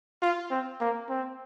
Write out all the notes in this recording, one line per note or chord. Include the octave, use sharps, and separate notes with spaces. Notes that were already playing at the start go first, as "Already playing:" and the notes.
F4
C4
A#3
C4